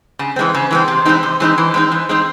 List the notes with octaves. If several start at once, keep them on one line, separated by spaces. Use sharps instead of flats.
C#3
E3 G#3 C4
C#3
E3 G#3 C4
C3
E3 G#3 C4 D#4
C3
E3 G#3 C4 D#4
E3
G#3 C4 D#4
E3
G#3 C4 D#4